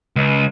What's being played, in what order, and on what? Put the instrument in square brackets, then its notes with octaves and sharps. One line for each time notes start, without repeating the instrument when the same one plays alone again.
[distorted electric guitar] C#2